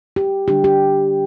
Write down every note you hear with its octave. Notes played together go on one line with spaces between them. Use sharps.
G4
D3 G3 D4 G4
G4